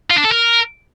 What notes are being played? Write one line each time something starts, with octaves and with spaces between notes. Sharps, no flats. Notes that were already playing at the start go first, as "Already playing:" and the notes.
F4
D4
A4
A#4